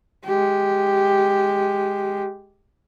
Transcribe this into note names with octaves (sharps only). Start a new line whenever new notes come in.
G#3 G4